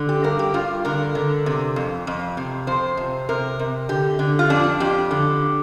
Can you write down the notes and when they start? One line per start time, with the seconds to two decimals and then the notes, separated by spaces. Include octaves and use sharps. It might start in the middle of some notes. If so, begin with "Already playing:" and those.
Already playing: D3
0.09 G4
0.24 G2 A#4
0.39 G4
0.54 G2 F4
0.85 D3 A#4
1.15 D3
1.46 C3
1.76 F2
2.07 F2
2.37 C3
2.67 F2 C5
2.97 C3
3.29 C3 A#4
3.59 C3
3.89 D3 G4
4.19 D3
4.39 F4
4.50 F2 D4
4.80 F2 G4
5.11 D3